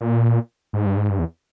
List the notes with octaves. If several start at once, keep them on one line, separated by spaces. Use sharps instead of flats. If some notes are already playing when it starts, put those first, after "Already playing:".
A#2
G#2
G2
G#2
G2
E2